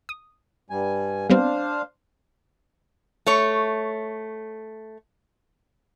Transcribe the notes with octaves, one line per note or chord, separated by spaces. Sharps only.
D#6
G2 G3 G#5
G3 B3 C4 D4 C5 F5
A3 C#5